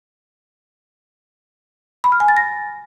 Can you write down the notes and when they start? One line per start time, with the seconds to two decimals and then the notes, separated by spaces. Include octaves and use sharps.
2.04 B5
2.12 F6
2.20 G#5
2.28 A6
2.37 A#6